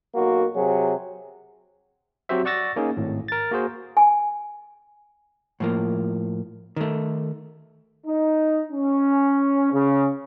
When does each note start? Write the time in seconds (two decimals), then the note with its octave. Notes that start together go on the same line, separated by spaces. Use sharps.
0.15 B1 A#3 F#4
0.55 C3 F#3 G#4
2.29 F#3 C4 F#4 G4 C5 E5
2.45 D5 F#5 C#6 E6 A6 A#6
2.76 A#3 C#4 D#4 G#4
2.97 G#1 A2
3.28 A#4 A6
3.51 A#3 F#4 G#4 C5
3.97 G#5
5.60 A2 F3 A#3
6.76 D#3 A3
8.06 D#4
8.72 C#4
9.73 C#3